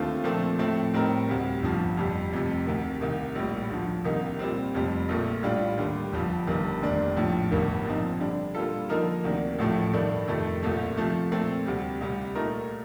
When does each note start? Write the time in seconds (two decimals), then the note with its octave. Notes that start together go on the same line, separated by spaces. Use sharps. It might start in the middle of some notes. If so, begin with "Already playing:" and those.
Already playing: D#2 D3 A3 C4 F4
0.24 A#2 F3 A3 C4
0.58 A2 F3 A3 C4
0.93 A2 G3 C4 D#4 A#4
1.28 D2 C3 G3
1.63 G1 G2 F3
1.97 F2 C3 G3
2.32 F1 F2 C3
2.66 D2 C3 D#3
3.01 C2 C3 D#3
3.35 A#1 A2 G3
3.70 D2 D3 F3
4.04 C2 C3 D#3 A#3 D#4
4.39 A#2 G3 C4
4.74 F1 F2 C3 G3
5.09 A#1 A#2 A3
5.43 A2 G3 D4 F4
5.78 D#2 D3 G3
6.13 G1 G2 F3
6.47 G1 G2 D#3 G3
6.82 F1 D#2 D3 G3 D4
7.16 A#1 A2 F3
7.51 G1 G2 D#3 A#3
7.85 A#2 F3 C4 D#4
8.20 D3 G3 D4
8.55 A#2 G3 A#3 F4 A4
8.89 D3 F3 A#3 D#4 A#4
9.24 D2 C3 D#3 A#3 D4
9.58 A1 A2 F3 A3
9.93 G2 D#3 A3 D4
10.28 F2 C3 D#3 A3
10.63 C2 A#2 A3
10.97 C3 F3 A3
11.32 A#2 A3 C4
11.66 D2 C3 G3
12.00 C2 C3 G3
12.35 A#2 A3 D#4 A#4